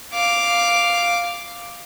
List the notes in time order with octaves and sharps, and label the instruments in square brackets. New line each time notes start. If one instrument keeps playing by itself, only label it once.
[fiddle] F5 D6